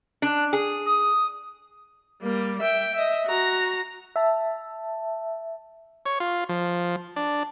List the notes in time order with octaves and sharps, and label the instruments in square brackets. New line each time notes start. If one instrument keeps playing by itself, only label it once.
[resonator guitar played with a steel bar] D4
G#4
[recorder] D#6
[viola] G3 A#3
E5 G5
D#5 E5
F#4 A#5
[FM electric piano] E5 A5
[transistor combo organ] C#5
F4
F3
D4